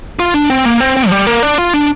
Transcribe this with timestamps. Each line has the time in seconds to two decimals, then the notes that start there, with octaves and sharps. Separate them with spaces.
0.19 F4
0.34 D4
0.50 C4
0.65 A#3
0.80 C4
0.97 C4
1.07 F3
1.11 G3
1.26 A#3
1.43 D4
1.58 F4
1.73 D4